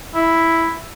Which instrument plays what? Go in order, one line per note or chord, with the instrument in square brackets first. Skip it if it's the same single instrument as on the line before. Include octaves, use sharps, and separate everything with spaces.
[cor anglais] E4